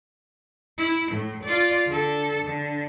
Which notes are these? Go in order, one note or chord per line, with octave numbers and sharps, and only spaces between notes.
E4
A2
F4 D5
D3 A4
D3